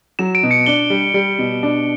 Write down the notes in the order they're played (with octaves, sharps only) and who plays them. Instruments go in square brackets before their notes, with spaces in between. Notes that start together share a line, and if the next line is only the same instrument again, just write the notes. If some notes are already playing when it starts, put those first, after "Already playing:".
[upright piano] F#3 [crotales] E7
[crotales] D7
[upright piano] B2
[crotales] C#7
[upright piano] D4 [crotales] G7
[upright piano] G3
G3
B2
D4